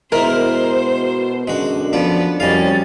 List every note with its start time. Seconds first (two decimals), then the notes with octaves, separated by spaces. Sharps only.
0.12 B2 G#3 E4 A#4 C5
1.48 F#2 D3 G#3 F#4
1.93 F3 B3 D5
2.40 C2 F2 F#3 G3 C#4 D#5 F5 A6